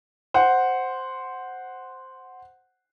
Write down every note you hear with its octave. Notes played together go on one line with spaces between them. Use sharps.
C5 F#5